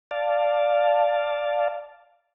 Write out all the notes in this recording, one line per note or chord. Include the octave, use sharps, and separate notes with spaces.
D5 F5 A5